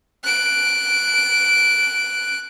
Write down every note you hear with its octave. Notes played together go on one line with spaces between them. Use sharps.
F#6 D7